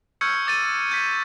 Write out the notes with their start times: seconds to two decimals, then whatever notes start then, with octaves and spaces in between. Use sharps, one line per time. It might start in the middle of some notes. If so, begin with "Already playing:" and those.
0.21 C#6 E6 F6 G6 G#6 C#7
0.47 D6 A6 D#7
0.91 G6 B6